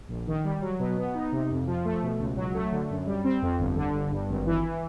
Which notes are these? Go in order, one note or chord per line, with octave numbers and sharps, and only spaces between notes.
A#1
D#3
G3
F#3
B2
B3
D#4
C3
F2
F3
A3
B2
C#2
F#3
A3
D3
F#2
G3
C4
F2
G1
D3
G1
G2
G#1
E3